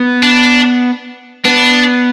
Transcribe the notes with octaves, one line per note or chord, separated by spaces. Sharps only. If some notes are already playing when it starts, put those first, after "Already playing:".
Already playing: B3
D4
B3 D4